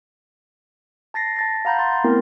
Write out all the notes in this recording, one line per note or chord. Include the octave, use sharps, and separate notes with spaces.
A5 A6 A#6 C7
A5 A6 A#6
F5 F#5 A#5 B5 G6
C6 G6 A6
A3 B3 C4 E4 A#4